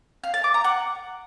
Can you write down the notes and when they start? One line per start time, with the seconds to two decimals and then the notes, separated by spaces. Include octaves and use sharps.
0.24 F5
0.34 A5
0.44 D6
0.54 A#5
0.64 F#5